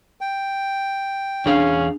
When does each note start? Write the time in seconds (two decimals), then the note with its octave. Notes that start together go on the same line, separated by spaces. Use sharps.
0.21 G5
1.46 E2 C#4 D4 G#4 F5